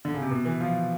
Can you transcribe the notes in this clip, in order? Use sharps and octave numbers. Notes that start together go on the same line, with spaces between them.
D3
C#3
C3
B2
E3
F3